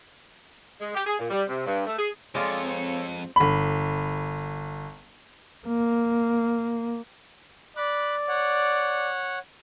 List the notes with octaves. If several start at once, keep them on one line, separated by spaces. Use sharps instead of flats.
G#3
G4
G#4
A#2
G3
C3
G2
A3
G#4
F2 G#3 F4 A4 C#5 D5
C4
G1 B5
A#3
D5 B5 D6 F#6
C#5 F#5